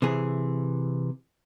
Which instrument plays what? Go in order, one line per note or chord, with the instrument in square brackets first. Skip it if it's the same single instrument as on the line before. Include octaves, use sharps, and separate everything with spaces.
[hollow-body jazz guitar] C3 E3 G#4